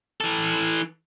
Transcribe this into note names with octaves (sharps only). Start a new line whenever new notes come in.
E3 A4